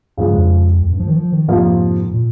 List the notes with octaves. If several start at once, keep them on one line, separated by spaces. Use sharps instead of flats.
G2 C#3 F3 G#3
F2
F2
G2
F3
D#3
F3
D#3
F2 G#2 C3 F3 A#3 F4
A#2